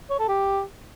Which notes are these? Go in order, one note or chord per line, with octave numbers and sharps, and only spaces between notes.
C#5
A4
G4